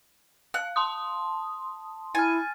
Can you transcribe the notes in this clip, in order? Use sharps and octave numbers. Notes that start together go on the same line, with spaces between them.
F5 F#6
A5 C6 D#6
E4 G#5 F6 A6